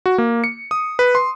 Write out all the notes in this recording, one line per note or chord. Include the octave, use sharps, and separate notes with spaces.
F#4
A#3
C#7
D#6
B4
C6